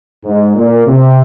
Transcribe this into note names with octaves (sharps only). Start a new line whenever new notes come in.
G#2
A#2
C3